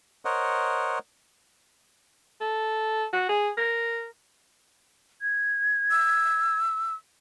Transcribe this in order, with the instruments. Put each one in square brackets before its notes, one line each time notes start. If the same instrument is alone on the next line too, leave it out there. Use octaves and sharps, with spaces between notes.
[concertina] A#4 C5 C#5 D#5 F#5
[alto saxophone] A4
F#4
G#4
A#4
[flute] G#6
[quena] E6